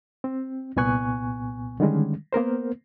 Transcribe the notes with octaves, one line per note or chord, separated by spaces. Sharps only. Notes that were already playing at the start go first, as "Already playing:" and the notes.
C4
C2 A#2 B3 G#5 C#6 F#6
D3 D#3 G3 G#3 C#4
A#3 B3 A#4 C5